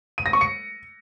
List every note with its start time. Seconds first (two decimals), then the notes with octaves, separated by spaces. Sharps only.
0.18 D#7
0.26 A#6
0.33 C#6
0.41 C#7